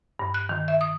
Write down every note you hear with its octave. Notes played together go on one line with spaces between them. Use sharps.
G2
F#6
D#3
E5
D#6